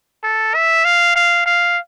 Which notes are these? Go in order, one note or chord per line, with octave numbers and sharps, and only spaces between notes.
A4
E5
F5
F5
F5